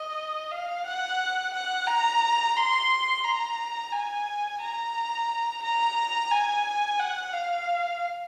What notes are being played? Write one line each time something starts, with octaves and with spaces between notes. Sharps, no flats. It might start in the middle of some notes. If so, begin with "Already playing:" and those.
Already playing: D#5
F5
F#5
F#5
A#5
C6
A#5
G#5
A#5
A#5
G#5
F#5
F5